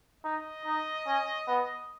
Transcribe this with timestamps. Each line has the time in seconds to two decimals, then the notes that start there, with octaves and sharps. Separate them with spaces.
0.24 D#4 D#5
0.66 D#4
1.06 C#4
1.47 B3